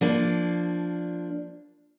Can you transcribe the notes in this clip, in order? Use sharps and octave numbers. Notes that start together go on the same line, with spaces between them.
F3 A#3 D4